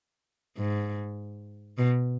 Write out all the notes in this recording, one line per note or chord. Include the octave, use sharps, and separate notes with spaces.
G#2
B2